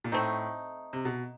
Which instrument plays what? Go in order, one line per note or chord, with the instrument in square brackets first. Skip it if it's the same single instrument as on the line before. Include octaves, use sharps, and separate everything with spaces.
[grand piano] A#2
[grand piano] A2 [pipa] A3 C4 D#4
[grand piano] C3
B2